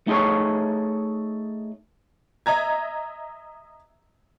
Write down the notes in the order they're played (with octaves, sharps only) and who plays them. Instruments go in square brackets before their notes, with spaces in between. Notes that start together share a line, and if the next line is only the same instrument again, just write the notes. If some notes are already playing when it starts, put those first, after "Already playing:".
[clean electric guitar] A3 D#4 G#4 A4 C#5
[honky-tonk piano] D#5 E5 A#5 G#6